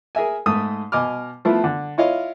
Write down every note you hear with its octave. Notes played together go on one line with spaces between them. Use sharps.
G#4 A#4 E5 G#5
G#2 A3 D#6
B2 D#5 G#5 D6 F6
F3 A3 B3 E4 F4
D3
E4 F4 C#5 D#5 F5